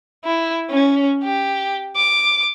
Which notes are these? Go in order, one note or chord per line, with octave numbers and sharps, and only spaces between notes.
E4
C#4
G4
D6